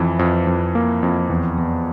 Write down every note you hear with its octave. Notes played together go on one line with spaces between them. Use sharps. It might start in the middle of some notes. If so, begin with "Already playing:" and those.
Already playing: F2 E3
F2
F2
A#3
F2
E2
E2